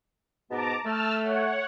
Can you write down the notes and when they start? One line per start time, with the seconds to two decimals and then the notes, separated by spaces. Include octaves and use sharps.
0.50 G#2 B2 B3 A5 A#5 D6
0.84 A3 A5 E6 F6
1.23 C#5 F#5